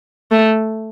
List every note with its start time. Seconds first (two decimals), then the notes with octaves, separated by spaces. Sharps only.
0.31 A3